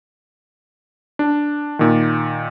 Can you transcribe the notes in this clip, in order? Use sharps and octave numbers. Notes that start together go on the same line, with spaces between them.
D4
A#2 D#3